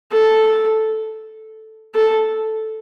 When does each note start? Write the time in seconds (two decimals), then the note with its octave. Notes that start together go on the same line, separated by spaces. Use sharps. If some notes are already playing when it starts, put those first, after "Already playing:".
0.12 A4
1.95 A4